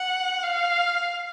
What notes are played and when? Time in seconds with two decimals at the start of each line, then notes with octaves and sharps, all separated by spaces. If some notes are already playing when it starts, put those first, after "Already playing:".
Already playing: F#5
0.43 F5